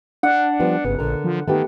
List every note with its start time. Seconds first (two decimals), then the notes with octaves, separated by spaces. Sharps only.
0.23 D4 F#5
0.60 F3 G3 B3
0.85 G1 C#3 B3
0.99 A#1 D3 A#4
1.24 F3
1.48 D#3 A3 B3 G4